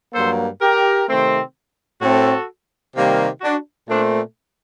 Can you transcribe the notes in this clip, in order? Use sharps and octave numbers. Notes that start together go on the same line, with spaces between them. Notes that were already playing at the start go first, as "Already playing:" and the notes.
G2 F#3 A#3 A4 C5
G4 A#4
C3 D#3 A3 C4
A2 A3 C4 F#4 A4
C3 D#3 G3 A#3
D4 F#4
A#2 A3 C4 D4